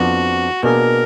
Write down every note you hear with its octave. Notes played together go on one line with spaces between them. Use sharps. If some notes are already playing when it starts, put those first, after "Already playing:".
Already playing: F2 F3 B3 D4 F4 F#4
B2 A#3 D4 G#4 A#4